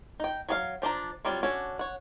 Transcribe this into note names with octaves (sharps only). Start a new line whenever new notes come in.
D#4 G5
F#3 G#4 F5
F3 D4 C5 A#5
F#3 G3 C4 F4
C#4 D4 F#4 A4
C#5 F#5